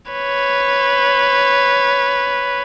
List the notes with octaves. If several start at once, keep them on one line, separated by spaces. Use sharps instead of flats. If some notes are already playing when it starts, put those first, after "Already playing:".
B4 C#5